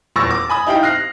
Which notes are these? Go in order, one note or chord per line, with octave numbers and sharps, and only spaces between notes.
D#1 E2 C#6 E6 A6 A#6
D6
G#5 B5 D#6
D#4 E4 G4 F5 G5
F6 F#6 A#6 C7